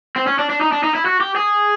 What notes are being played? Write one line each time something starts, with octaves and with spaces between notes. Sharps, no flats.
C4
C#4
D4
D4
D#4
D4
D#4
E4
F#4
G4
G#4